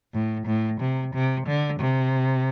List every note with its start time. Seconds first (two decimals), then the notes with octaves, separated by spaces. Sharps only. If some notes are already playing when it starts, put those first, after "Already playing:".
0.14 A2
0.46 A2
0.80 C3
1.14 C3
1.46 D3
1.79 C3